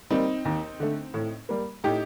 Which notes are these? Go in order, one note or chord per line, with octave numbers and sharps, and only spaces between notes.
G3 A#3 C4 D#4
D#2
D3 A3
A2
G3 A#3
A2 D#4 G4